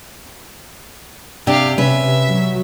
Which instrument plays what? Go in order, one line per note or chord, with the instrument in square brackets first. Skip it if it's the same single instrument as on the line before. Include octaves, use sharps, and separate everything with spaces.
[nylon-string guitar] C3 D4 [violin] G4 F5
[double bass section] C3 [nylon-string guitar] C#4 B4 [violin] E5
[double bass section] F#3